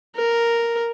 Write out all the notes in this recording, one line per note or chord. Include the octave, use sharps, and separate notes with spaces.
A#4